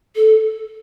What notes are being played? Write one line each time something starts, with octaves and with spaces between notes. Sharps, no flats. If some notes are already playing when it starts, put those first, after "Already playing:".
A4